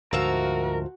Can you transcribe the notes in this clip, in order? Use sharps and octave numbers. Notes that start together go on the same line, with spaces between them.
D2 G#2 D3 F3 F#4 A#4 E5 F5